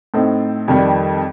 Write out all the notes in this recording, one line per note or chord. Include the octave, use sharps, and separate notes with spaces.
A2 A3 C4 D#4
F2 D#3 G3